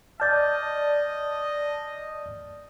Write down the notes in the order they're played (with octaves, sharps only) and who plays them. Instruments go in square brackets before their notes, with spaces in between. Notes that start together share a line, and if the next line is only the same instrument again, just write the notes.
[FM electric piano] D5 A5 [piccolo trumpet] D#5 [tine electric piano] F6 G6 A6